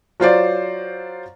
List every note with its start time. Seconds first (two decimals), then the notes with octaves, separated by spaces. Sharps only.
0.20 F#3 F4 C5 D5